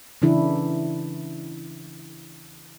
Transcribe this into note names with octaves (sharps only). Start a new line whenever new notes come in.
C#3 E3 D4 E4